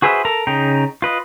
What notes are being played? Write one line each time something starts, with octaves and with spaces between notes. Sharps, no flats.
F#4 G#4 B4 C5 E5
A4 A#4 A#5
C#3 D#4 G5 A#5
F4 B4 D#5